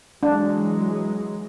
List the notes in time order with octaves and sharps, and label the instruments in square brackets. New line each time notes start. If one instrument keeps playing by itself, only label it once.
[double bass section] E3 F#3 G#3 [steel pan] D4